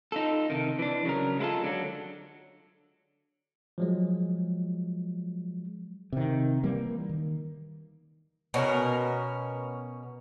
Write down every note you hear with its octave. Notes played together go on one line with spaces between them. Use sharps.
D#4 F4 A4
C3 D#3
E3 D4
C#3 F#3 A#4
G#3 A#3 E4 F4 A4
D3 F#3
F3 F#3 G#3
C3 D#3
E3 G3 A#3
D#3
B2 C#4 G4 A#4